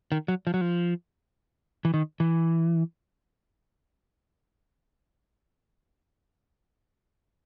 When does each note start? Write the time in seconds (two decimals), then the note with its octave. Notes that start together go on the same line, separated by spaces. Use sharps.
0.12 D#3
0.28 F#3
0.47 F3
0.54 F#3
0.61 F3
1.85 E3
1.94 D#3
2.20 E3